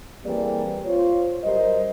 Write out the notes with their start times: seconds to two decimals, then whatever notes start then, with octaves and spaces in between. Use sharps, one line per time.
0.25 E3 G3 A#3 C4 G#4 D5
0.85 F4 C5 C#5
1.44 F#2 G3 A#4 C5 D#5